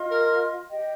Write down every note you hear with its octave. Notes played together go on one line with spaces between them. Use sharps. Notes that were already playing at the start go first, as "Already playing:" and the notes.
Already playing: F4 D#5 C6
A#4
G4 D#5 G5